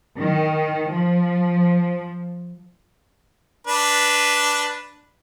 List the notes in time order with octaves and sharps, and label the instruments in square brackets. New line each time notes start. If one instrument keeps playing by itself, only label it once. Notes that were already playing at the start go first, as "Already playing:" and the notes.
[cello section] D#3
F3
[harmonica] D4 B4